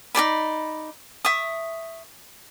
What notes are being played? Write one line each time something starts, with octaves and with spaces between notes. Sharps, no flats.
D#4 G#4 D5 B5
E5 C#6 D#6